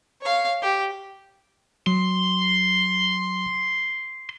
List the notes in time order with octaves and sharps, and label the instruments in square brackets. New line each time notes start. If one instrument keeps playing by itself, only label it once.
[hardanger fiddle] C#5 F5
G4
[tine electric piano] F#3 [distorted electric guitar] C6